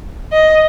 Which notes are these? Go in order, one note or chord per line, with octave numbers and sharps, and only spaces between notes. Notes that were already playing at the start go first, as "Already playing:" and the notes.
D#5